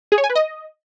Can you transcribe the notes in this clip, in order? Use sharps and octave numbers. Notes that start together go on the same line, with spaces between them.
G#4
C#5
G#5
B4
D#5